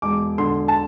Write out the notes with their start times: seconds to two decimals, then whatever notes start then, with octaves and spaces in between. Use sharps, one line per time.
0.02 E1 D6
0.38 D3 C6
0.68 A5